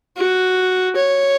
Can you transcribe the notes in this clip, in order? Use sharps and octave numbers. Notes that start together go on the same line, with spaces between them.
F#4
C#5